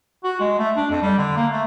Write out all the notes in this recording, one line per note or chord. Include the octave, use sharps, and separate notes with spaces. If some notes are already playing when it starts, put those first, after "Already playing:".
F#4
G#3
A3
D4
F2
G3
D3
A#3
A3